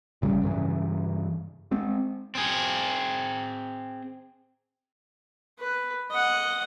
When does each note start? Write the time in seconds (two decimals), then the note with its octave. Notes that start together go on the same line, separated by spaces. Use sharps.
0.22 A1 C#3 G3
0.43 G2 C#3 E3
1.71 G#3 C4
2.35 C4 G#4
5.59 B4
6.11 D#5 F#5